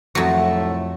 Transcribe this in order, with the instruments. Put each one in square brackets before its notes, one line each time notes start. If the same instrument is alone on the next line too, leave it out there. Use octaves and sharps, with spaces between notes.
[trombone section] C2 A2 A3 [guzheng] F2 F#3